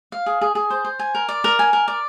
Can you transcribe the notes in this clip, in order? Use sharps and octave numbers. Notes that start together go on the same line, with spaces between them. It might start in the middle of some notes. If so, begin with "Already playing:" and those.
F5
G#4
G#4
G#4
C5
C5
G#5
A#4
D5
A#4
G#5
A#4
D5